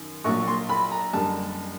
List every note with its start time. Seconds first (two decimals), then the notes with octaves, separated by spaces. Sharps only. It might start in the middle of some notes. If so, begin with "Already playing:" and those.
Already playing: F#2 D#3
0.24 A#1 A#2 F#3 C#6
0.48 C6
0.69 B5
0.92 A#5
1.13 F#1 F#2 D3 G3 A5